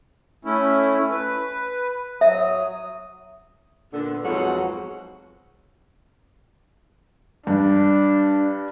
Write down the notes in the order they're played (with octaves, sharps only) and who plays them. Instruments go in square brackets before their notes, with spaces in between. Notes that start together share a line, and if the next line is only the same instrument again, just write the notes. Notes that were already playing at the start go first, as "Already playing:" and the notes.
[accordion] A3 C#4 E4
B4
[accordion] F#3 D#6 [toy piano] E5
[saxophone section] A#2 D3 B3
F2 G#2 B2 F3 F#3 F#5
[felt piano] G2 [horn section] D4